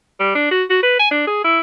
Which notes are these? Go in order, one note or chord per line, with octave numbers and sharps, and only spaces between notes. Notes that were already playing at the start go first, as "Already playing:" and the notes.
G3
D4
F#4
F#4
B4
G#5
D4
G#4
E4